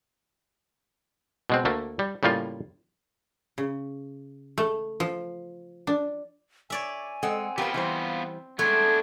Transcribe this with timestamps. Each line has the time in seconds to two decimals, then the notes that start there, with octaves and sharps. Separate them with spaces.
1.50 B2 G#3 C4
1.65 D2 A3 A#3
1.99 G3
2.23 A2 C#3 G3 A#3 F4
3.58 C#3
4.58 A3
5.00 F3
5.87 D4
6.70 C#5 D5 E5 G#5
7.23 G#3 C4 A4 F#5
7.58 B3 C4 F4 G4 A#4 B4 C6
7.74 E3 G3 C5
8.59 G#3 A3 B3 D4 G#6